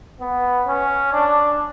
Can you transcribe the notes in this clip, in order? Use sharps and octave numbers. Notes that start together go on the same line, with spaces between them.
B3
C#4
D4